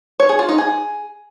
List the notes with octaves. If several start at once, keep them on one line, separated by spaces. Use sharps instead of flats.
C#5
G#4
F4
D#4
G#4